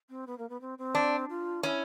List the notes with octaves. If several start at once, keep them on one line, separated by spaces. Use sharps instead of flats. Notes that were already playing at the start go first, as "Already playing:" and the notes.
C4
B3
A#3
B3
C4
C4
D4
F4
C#4 E4